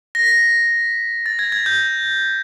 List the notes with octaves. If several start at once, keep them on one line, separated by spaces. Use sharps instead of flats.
A#6
B6
A#6
A6
G#6
G#6
G6